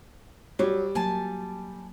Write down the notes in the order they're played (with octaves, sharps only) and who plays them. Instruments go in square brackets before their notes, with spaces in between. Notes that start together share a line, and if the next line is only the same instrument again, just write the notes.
[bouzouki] F#3 [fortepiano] G3
[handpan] F#3 A#3 [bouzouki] G#5 A5